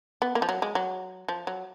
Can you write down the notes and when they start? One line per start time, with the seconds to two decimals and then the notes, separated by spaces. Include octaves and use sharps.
0.22 B3
0.35 A#3
0.42 F3
0.49 F#3
0.62 G#3
0.75 F#3
1.29 F3
1.47 F#3